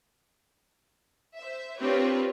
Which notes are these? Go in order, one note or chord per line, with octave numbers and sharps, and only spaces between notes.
C5 E5
C4 D4 F4 G4 B4 C#5